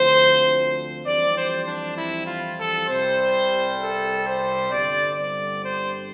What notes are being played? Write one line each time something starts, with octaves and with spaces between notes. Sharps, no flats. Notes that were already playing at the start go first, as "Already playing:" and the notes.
Already playing: D2 D3 F3 C4 C5
F2 E3 G3 C4 D5
C5
D4
E4
F4
A4
C2 C3 G3 C5
A4
C5
G1 G2 D3 G3 C4 D5
D5
C5